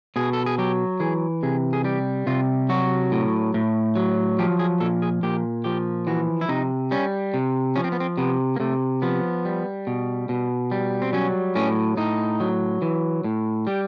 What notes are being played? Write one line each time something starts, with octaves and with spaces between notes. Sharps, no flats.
B2 G#4
A4
G#4
F#3 G4
E3 G#4
C3 G#4
G#4
G3 G4
C3 F4
F#3 F#4
A2
A2
F#3
F3 G4
G#4
A#2 A4
G#4
A#2 G4
F3 G4
E3 F#4
E4
C3 D#4
G3 C#4
C3
F3 C#4
C4
B3
C4
C3 B3
A#3
C3 A3
F3 B3
G3
B2
B2
G3
C4
F#3 C#4
A2 C#4
A2 D#4
F#3
E3
A2
G3 G4